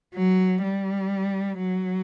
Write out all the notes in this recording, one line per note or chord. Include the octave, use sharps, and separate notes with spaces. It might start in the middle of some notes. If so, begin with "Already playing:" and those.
F#3
G3
F#3